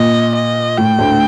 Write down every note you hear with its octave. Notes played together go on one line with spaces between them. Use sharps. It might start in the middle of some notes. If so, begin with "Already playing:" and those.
Already playing: A#2 D#5
D#5
A2 G5
D2 D3